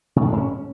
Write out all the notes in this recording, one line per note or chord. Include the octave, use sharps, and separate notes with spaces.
C3
A2
G#3
G#2
C#4